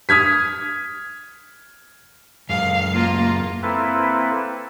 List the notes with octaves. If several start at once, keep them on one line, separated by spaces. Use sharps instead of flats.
D#6 F6 G#6 B6
F#2 G#3 F5
A#3 F4
A#3 C4 E4 A4 B4